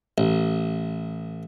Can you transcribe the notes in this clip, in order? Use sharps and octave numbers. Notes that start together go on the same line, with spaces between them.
A1